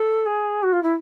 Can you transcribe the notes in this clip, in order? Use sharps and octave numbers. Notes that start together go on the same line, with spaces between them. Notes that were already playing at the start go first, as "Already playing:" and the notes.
Already playing: A4
G#4
F#4
F4
E4